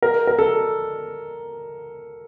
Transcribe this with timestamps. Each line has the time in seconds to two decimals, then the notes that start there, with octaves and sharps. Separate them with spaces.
0.02 A#4
0.27 A#4
0.39 A4